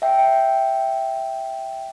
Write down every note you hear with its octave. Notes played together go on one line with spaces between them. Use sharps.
E5 G5